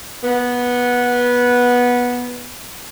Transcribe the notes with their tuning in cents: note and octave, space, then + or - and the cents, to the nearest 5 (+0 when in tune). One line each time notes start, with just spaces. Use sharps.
B3 -15